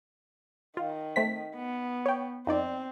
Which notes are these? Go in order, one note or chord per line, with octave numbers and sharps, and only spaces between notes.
D#3 F4
A3 C4 B6
B3
C#5 G5
F2 C4 D#4 D5